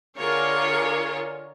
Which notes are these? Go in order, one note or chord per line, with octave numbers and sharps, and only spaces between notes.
D3 F4 G#4 A#4 C#5